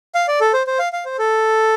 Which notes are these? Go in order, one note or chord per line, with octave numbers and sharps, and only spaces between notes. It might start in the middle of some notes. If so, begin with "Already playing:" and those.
F5
D5
A4
C5
C5
F5
F5
C5
A4